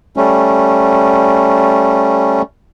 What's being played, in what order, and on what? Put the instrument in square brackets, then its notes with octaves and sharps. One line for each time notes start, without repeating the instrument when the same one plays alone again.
[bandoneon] G3 A3 C#4